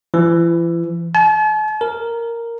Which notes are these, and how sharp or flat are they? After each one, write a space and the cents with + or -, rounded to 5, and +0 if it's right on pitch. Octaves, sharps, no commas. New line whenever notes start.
E3 +40
A5 -45
A#4 -5